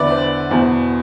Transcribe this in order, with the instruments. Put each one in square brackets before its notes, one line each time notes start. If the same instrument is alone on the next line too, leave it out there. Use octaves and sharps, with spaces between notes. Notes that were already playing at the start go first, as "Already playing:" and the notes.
Already playing: [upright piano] E2 D3 B4 D5 E5
C5
E2 B2 C5